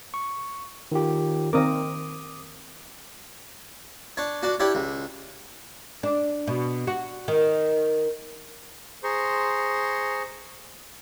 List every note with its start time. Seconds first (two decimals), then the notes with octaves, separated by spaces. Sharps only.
0.14 C#6
0.92 D#3 F4 G4
1.53 D#3 C4 A#4 D6 D#6
4.17 D4 C#5
4.43 D4 F#4
4.60 D4 E4 G4 C#5
4.75 C#2
6.03 D4
6.47 B2
6.87 F#4
7.28 D#3
9.03 G#4 C5 A#5 C6 C#6